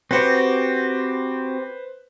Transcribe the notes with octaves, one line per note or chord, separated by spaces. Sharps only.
C4 F#4 G4 B4 C5